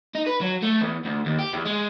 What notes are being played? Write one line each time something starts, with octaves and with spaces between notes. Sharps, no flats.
D#4
B4
F#3
A3
E2
D2
D#2
G4
E2
G#3